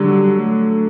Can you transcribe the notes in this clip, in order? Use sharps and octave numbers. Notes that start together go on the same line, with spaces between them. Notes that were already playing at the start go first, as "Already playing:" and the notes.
Already playing: D3 F#3 G3
A3